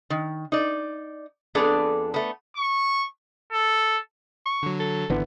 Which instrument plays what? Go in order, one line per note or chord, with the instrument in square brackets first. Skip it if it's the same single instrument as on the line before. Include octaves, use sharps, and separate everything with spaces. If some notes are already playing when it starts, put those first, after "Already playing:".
[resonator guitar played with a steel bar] D#3
D#4 D5
F2 B3 D4 G#4 A4 D5
A3 B3
[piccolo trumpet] C#6
A4
[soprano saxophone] C#6
[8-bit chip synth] D3 F#3
[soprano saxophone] A4
[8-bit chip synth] G#1 [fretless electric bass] D3 E3 B3